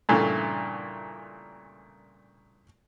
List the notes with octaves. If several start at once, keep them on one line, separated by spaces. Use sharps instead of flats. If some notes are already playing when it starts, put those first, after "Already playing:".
G2 A#2 C#3 E3 A3